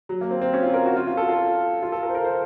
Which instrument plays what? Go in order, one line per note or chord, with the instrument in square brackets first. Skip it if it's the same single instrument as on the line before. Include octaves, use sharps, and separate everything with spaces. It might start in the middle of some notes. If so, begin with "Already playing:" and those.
[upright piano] F#3
A#3
C4
C4
C#4
F4
A#4
F#4
F4
F4
A4
F4
F4
A4
A#4
C5
A#4
C5